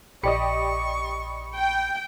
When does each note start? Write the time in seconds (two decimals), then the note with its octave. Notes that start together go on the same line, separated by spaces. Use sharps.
0.23 A#1 G4 D5 D#5 B5 C#6 C#7
1.55 G5